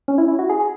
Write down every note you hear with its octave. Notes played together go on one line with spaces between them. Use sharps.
C#4
E4
E4
F#4
G#4
G#4